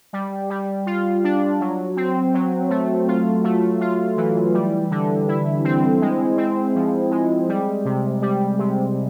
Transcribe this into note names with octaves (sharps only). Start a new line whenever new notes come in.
G3
G3
F4
D4
F#3
C4
F#3
A3
F4
A3
F4
E3
G3
D3
E4
C4
G#3
C4
F3
G#3
G3
C3
G3
C3